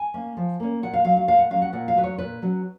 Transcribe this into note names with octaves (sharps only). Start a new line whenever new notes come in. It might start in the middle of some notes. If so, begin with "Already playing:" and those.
Already playing: G#5
A#3 C#4
F3
A#3 C#4
A#2 F#5
F5
F#3 C#4 F5
F5
A#2 F5
F#5
F#3 C#4 F5
F#5
A#2 F#5
F5
F#3 C#4 B4
C#5
A#2 B4
F#3 C#4